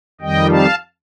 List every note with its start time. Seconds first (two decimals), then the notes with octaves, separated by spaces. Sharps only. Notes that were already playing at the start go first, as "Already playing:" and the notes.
0.21 F2 D#3 G3 D#5 G5
0.49 F5 A5